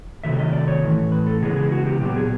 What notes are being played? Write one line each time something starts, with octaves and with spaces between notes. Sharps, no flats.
C3 D#3 F#3 A3 E5
E5
D#5
D5
C#5
A2 E3 A3
B4
A4
C#3 E3 G#3 B3 G#4
G#4
F#4
G4
A#2 F#3 B3 G4
G#4